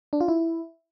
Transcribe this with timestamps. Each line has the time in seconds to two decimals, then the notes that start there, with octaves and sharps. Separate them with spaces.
0.13 D4
0.21 F4
0.28 E4